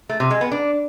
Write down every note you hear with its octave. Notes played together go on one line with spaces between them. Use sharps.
A3
C3
G#3
B3
D4